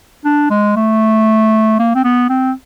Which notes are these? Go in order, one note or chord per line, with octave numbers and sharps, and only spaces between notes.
D4
G#3
A3
A#3
C4
B3
C4